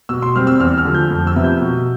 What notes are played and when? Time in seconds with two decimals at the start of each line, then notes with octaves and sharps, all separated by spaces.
0.09 B2 E6
0.22 C6
0.36 G3 C4 F6
0.47 E6
0.60 E2 F6
0.78 F6
0.85 D3 F3
0.95 G6
1.11 F2
1.27 E6
1.36 C3 F3 B3
1.44 G6
1.61 B2